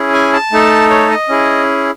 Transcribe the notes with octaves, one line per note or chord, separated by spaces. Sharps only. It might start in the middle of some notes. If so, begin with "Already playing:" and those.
Already playing: C#4 E4 G#4
G#5
A5
A3 D#4 A4
C#5
D#5
C#4 E4 G#4